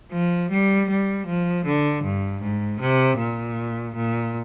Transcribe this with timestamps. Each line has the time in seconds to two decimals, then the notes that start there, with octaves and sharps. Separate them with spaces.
0.12 F3
0.50 G3
0.89 G3
1.26 F3
1.65 D3
2.04 G2
2.42 G#2
2.80 C3
3.18 A#2
3.96 A#2